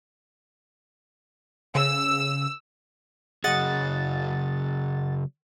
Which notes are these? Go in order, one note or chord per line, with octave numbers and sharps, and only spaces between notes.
C#3 E6
C#3 F#3 G#4 D#5 F#5 A6